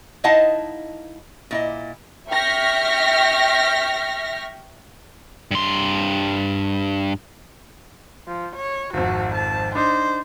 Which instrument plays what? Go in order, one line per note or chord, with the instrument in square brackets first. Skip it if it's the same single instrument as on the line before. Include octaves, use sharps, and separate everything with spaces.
[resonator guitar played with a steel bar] D#4 E4 D#5 F5 F#5 A5
A#2 E4 D#5
[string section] E5 G5 C#6 F6 A#6 B6
[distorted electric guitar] G2 C6
[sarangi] F3
C#5
[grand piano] G#1 F2 [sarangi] F#4
[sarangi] A5
[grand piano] D4 D#4 [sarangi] C5